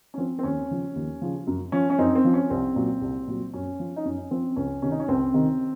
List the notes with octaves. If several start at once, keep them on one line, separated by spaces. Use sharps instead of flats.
C#4
F3 C4
C4
D#2 C#4
C#3 F3
D#2
C#3 F3
F#2
F3 C#4
C#4
F#2 C4 D#4
C4
F3
C#4
C2 C4
A#2 F#3
C2
A#2 F#3
F#2 C#4
F3
D#4
F#2 C#4
F3 C4
C#2 C#4
C3 D#3 C#4
D#4
C#4
C#2 C4
C3 D#3